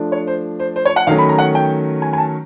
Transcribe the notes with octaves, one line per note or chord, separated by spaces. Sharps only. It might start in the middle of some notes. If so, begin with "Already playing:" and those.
Already playing: F3 A3 D4
C#5
C5
C5
C5
C#5
F#5
D#3 F#3 A3 C#4 F5
B5
A#5
F#5
G5
G#5
G#5
A5